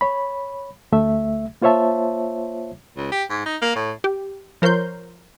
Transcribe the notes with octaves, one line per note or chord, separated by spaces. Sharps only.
C#5 B5
D2 A3 E5
A#3 F4 C5 C#5 E5 A5
C#2
G4
G#2
D#4
A#3
A2
G4
F3 A#4 C5 C#5 C6 G6